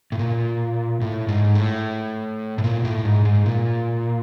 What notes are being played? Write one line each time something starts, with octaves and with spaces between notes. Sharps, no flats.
A2
A#2
A2
G#2
A2
A2
A#2
A2
G#2
G#2
A#2